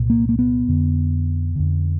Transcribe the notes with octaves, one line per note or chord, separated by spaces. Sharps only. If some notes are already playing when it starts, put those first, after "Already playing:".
Already playing: C2 A#2
A#3
A#3
B3
F2 D3
F2 D3